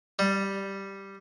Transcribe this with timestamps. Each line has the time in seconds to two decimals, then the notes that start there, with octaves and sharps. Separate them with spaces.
0.19 G3